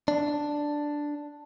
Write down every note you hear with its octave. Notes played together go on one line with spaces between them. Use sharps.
D4